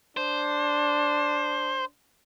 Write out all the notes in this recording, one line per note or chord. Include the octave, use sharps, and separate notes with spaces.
D4 C5